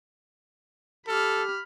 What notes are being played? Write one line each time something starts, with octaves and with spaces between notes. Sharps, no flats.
G4 A4 B5 F6